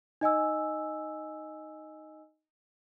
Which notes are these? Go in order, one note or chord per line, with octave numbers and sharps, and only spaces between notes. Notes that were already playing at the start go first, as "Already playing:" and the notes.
D#4 D#5 G#5 E6